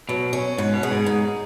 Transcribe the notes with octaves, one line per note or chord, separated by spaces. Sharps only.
B2 F#3
C#4
G#2 B4
B2
G#4
G#2
G#2 D#4